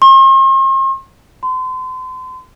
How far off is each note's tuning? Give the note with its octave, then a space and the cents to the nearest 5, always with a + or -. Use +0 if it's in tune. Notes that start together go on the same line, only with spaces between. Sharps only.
C6 +45
C6 -35